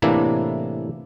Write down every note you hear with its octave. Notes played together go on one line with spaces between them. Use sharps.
A2 C3 E3 A#3 D4 E4